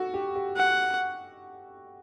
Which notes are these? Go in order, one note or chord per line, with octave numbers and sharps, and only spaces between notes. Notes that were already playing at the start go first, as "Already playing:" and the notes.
Already playing: F#4 A4
G4
G4
F#5